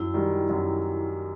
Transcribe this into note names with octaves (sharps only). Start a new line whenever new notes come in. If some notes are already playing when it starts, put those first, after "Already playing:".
Already playing: F#2 E4
D#3 G3
F#2